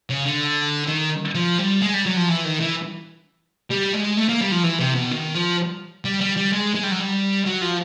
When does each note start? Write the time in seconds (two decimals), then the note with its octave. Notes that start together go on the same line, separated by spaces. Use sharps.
0.10 C#3
0.26 D3
0.88 D#3
1.35 F3
1.59 G3
1.82 G#3
1.94 G3
2.05 F#3
2.17 F3
2.29 E3
2.45 D#3
2.61 E3
3.70 G3
3.93 G#3
4.17 A3
4.29 A#3
4.41 G3
4.52 F3
4.64 E3
4.79 C3
4.95 B2
5.11 D#3
5.34 F3
6.05 G3
6.21 G3
6.36 G3
6.52 G#3
6.75 G#3
6.84 G3
6.92 F#3
7.00 G3
7.46 F#3
7.62 F3